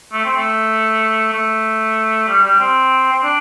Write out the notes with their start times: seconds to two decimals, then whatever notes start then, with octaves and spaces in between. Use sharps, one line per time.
0.13 A3
0.25 C4
0.37 A3
1.33 A3
2.28 G3
2.44 G3
2.60 C4
3.13 C4
3.23 D4